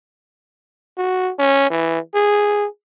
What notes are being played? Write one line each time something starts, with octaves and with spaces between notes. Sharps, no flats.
F#4
C#4
E3
G#4